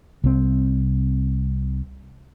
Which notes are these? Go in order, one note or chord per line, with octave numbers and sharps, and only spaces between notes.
C2 C4